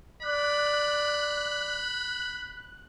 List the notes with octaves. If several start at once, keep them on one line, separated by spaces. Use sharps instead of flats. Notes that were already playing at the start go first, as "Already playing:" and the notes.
D5 B5 F#6